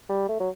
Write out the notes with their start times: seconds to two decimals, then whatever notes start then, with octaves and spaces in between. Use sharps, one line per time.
0.09 G3
0.29 A3
0.40 F#3